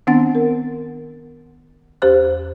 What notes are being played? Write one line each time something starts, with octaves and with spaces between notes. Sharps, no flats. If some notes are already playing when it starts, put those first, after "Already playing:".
D#3 B3 C4 D4 F#5 A6
A#4
E2 G4 C5 F#6